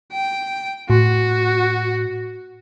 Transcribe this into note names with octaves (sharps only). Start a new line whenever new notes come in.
G5
A2 F#4